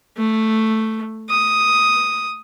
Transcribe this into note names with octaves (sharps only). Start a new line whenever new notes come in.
A3
D#6